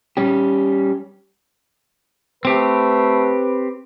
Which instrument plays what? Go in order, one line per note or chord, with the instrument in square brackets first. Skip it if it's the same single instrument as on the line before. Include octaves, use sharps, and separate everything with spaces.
[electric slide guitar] G3 C#4 G4
[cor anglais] A3 [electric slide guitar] C4 G4 [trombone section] B4